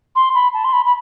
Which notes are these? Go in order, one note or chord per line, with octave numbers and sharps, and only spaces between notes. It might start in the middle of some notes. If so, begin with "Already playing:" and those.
C6
B5
A5
C6
B5
B5